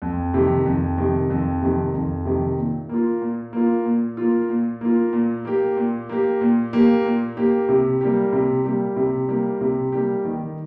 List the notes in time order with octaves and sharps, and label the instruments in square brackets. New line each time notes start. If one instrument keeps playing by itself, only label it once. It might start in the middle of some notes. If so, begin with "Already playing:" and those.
[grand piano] F2
C3 D#3
F2
C3 D#3
F2
C3 D#3
F2
C3 D#3
A#2
A#3 F4
A#2
A#3 F4
A#2
A#3 F4
A#2
A#3 F4
A#2
A#3 G4
A#2
A#3 G4
A#2
A#3 G4
A#2
A#3 G4
C3
G3 A#3 G4
C3
G3 A#3 G4
C3
G3 A#3 G4
C3
G3 A#3 G4
D#3